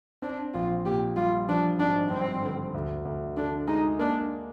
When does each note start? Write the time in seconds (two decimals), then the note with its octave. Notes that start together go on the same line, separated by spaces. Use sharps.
0.22 C4 D4
0.54 A#1 F4
0.85 A#2 G4
1.16 G3 F4
1.48 F3 D4
1.79 G#1 D4
2.11 G2 C4
2.42 D3
2.74 D2
3.05 D2
3.37 D3 D4
3.68 G#3 D#4
3.99 A#3 D4